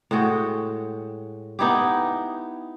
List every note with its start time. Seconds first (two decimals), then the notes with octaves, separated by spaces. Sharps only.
0.11 A2 G#3 F#4 G5
1.59 B3 D#4 E4 G4